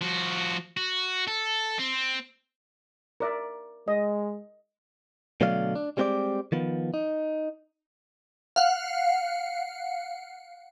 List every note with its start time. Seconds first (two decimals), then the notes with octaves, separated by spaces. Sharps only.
0.01 F3 F#4
0.77 F#4
1.27 A4
1.79 C4
3.20 A#4 D5 E5
3.88 G#3 D#5
5.41 B2 D3 F#3 A3 D5 F5
5.75 D4
5.97 G3 G#3 C4 F#4 G4 D5
6.52 D#3 F3 B3
6.94 D#4
8.56 F5 F#5